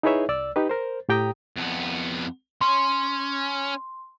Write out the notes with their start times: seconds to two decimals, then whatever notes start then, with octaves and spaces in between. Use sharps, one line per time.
0.03 D#4 E4 G#4 B4 C#5 E5
0.29 C2 D5 E6
0.56 D#4 G4 B4
0.69 A#4 C5
1.09 A2 G4 G5 A#5 D#6
1.56 F2 B3
2.61 C#4 C6